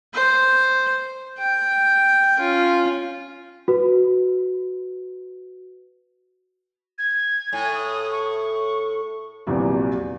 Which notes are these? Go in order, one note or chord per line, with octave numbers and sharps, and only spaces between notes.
C5
G5
C#4 F4
F#4 B4
G#6
A2 G#5
D#6
C#6
A#1 E2 C3 F#3